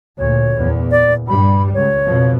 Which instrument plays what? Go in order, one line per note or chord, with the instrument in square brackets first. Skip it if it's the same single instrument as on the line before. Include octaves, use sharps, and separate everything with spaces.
[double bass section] D2 A#2 [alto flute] C#5
[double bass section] E2 A#2
[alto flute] D5
[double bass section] G2 G3 [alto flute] B5
[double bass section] C#2 [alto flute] C#5
[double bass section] F2 B2 F3